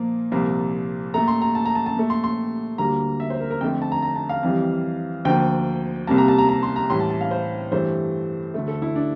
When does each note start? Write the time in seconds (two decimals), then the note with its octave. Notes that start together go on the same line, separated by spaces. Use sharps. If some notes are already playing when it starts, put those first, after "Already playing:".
Already playing: A#2 F3 A#3
0.32 C2 A#2 F3 A#3
1.14 A#2 A3 A#5
1.28 C6
1.42 A#5
1.55 A5
1.66 A#5
1.75 A5
1.86 A5
1.96 A#2 A3
2.10 C6
2.24 C6
2.78 D2 D3 G3 A#3 A#5
3.20 E5
3.30 C5
3.40 A#4
3.51 A#4
3.61 F2 D3 A3 G5
3.82 A5
3.92 A#5
4.02 A#5
4.16 A5
4.29 F5
4.43 F2 E3 G3
5.25 D2 D3 F3 A#3 G5
6.07 C2 C3 G3 A#3 A5
6.18 A#5
6.28 A5
6.38 A#5
6.49 A#5
6.63 C6
6.76 A#5
6.90 A2 E3 G3 C6
7.00 A5
7.10 A5
7.21 F5
7.31 C5
7.72 G2 E3 A3 C5
8.54 D2 D3 A3
8.68 A4
8.82 E4
8.96 D4